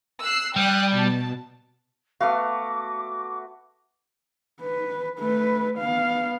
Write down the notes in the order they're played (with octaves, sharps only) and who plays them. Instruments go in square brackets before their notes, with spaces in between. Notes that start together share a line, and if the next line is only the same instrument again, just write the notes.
[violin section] E6 F#6 C7
[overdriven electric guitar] G3 [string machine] D5 [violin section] G5 D#6 F#6
[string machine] B2 [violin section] A5
[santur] A3 B3 F#4 [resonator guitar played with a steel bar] F5 [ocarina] D6
[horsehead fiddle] B4
A3 B4
B3 F5